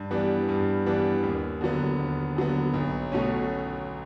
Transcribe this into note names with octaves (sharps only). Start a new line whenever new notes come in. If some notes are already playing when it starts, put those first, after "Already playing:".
Already playing: G2
E3 G3 B3 D4
G2
E3 G3 B3 D4
D#2
D3 F#3 B3
D#2
D3 F#3 B3
B1
B2 F#3 A3 C#4